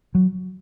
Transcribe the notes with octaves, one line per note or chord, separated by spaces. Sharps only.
F#3